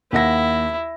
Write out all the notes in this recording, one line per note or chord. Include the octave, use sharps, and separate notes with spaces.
D#2 E4 F#5 A#6